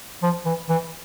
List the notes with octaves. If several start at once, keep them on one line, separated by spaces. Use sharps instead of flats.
F3
E3
E3